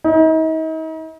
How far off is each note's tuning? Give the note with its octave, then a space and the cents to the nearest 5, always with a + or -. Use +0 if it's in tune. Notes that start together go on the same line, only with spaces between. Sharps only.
D#4 +40